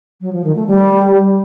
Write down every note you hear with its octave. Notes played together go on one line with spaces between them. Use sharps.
F#3
F3
D#3
A3
G3